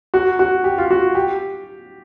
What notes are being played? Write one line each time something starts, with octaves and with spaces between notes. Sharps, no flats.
F#4
F#4
G4
F4
F#4
G4